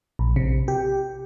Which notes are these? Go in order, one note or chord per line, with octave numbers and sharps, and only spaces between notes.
A#1
C3
G4